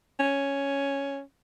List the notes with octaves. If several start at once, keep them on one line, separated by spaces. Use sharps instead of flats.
C#4